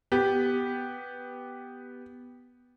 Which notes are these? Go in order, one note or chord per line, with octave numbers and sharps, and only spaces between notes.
B3 G4